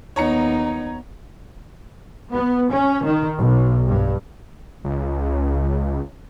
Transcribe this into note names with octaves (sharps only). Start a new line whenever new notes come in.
D#2 B3 D#4 C#5 A#5 C#7
B3
C#4
D#3
B1
G2
C#2